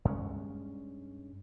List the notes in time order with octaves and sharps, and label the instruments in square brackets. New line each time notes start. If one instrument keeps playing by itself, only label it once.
[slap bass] G2 G#3 C#4